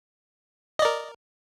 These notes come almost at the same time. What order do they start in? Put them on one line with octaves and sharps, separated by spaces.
D#5 D5 A#4